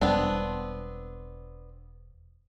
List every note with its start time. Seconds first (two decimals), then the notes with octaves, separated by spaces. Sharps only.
0.01 E1 G3 B3 C4 D4